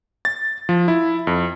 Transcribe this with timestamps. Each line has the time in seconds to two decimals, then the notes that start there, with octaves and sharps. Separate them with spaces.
0.25 A6
0.69 F3
0.88 E4
1.27 F2